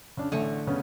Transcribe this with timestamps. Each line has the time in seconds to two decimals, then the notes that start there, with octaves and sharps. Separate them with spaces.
0.17 C#3 C#4 D4
0.32 A1 D3 A3 C#6 D#7
0.67 C#3 B3 C#4